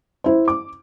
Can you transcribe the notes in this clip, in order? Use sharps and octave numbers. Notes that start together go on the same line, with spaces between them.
E4 C5
D6